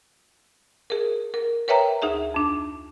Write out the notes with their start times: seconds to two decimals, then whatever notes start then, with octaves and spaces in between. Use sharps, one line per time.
0.90 G#4 A#4
1.34 A#4
1.68 A#4 B4 C#5 E5 G5 A#5
2.02 D2 D#4 G#4 E5
2.34 F2 D4